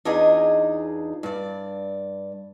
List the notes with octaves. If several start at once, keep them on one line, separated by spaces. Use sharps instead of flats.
E2 D4 D#4 F4 G#4 D#5
G2 D5